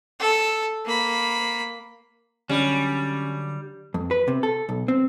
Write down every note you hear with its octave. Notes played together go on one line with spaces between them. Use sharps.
A4
A#3 B5
D3 F#3 G3 C#4
F2
B4
C3
A4
B1
C4